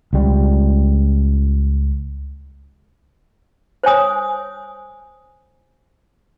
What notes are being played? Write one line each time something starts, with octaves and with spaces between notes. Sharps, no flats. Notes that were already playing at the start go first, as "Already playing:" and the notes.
C#2 G3
C5 C#5 G#5 D#6